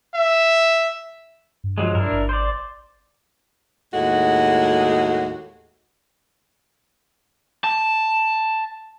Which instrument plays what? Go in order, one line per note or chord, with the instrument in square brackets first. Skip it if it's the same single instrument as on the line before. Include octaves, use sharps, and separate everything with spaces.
[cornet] E5
[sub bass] G2
[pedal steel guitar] F3 F#3 G#3
[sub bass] G2 [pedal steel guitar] D4 E4 A#4
[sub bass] G#1
[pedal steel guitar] C5 D5
[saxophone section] D#2 A2 G#3 F#4
[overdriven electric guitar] A5